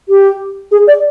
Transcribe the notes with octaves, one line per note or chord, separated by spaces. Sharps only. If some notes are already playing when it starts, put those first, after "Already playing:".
G4
G#4
D5